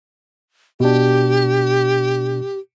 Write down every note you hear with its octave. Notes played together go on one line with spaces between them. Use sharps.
B2 D4 G4